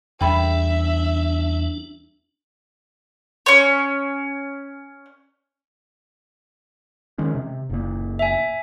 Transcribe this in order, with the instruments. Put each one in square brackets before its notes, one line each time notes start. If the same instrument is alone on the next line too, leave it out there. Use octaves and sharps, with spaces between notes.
[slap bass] E2 G3 [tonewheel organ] D4 [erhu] E5 [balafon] G5 B5
[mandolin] C#4 C#5
[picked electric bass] D#3 G#3 C#4
C3
F#1 A#2
[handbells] E5 G#5